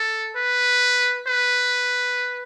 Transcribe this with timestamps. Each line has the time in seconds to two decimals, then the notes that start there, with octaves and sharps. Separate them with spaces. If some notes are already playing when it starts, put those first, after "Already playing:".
Already playing: A4
0.36 B4
1.27 B4